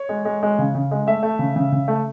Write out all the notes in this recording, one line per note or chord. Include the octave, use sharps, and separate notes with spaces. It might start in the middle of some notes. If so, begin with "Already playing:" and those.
Already playing: C#5
G#3
G#3
G#3
C#3
C#3
G#3
A3 E5
A3
C#3
C#3
C#3
A3